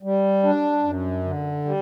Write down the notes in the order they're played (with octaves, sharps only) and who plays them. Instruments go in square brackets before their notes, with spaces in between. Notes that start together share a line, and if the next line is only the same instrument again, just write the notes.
[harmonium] G3
D4
F#2
D3
G3